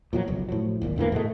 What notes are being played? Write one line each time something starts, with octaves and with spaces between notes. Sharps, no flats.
A#2 F3 F#3
F#1 B1
A2 F3 F#3
D1 G#1 A#2
E1 D2 E3 A#3
G#2 B2 G#3 A3